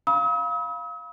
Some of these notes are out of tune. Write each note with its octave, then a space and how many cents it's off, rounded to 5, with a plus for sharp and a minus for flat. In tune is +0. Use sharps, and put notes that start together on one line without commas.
F5 +0 B5 -25 D#6 +45